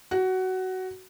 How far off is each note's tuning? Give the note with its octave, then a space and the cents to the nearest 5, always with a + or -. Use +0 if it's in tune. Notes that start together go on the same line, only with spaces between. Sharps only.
F#4 +15